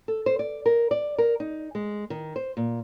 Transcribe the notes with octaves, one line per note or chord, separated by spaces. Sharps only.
A4
C5
D5
A#4
D5
A#4
D#4
G#3
D#3
C5
A#2